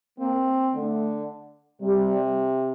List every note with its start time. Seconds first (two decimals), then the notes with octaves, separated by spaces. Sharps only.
0.19 A#3 C4
0.74 D3 A3
1.82 C3 G3